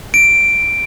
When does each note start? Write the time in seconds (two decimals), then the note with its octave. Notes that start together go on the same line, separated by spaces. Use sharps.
0.14 D7